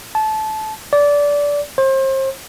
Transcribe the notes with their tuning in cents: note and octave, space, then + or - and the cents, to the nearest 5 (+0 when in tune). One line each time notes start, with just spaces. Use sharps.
A5 -20
D5 -20
C5 +35